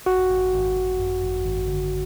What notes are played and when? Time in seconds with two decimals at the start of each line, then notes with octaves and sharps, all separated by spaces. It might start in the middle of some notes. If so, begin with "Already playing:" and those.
0.06 G#1 F#4
0.29 G#1
0.53 G#1
0.76 G#1
0.99 F#2
1.22 G#1
1.45 G#1
1.68 D3